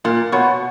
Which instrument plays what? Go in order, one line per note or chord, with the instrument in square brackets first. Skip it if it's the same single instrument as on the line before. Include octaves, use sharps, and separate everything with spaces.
[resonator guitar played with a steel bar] A#2 [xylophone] A#4
[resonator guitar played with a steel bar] B2 [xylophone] C#5 F#5 C#6